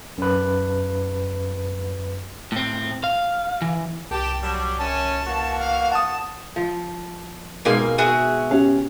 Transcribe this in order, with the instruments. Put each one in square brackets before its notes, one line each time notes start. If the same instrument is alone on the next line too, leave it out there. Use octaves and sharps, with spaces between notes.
[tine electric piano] F#2 B4
[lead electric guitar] A2 C4
F5
E3
[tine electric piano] C2 [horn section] G4 [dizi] A5
[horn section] F#3 G3
[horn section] F#2 C#4 [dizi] A5
[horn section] E3 A#3 F#4
[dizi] F5
[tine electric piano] F#5 D#6 [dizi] A5
[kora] F3
[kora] G#2 B2 C4 [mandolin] A#3 G#5
[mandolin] F#4 G#4 E5
[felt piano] C#4 G4 [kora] F5 F#5